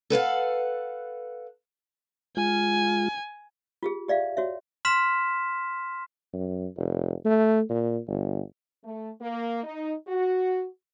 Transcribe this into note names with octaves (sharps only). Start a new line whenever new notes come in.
A4 B4 F5 F#5
G#3 F4 G#5
F4 G4 G#4
G4 D5 E5 F5
F#4 C#5 E5
C6 F6 B6 E7
F#2
F1
A3
A#2
G1
A3
A#3
D#4
F#4